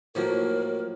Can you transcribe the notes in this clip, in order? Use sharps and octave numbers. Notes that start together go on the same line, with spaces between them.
A2 F3 F#3 A#3 E4 A#4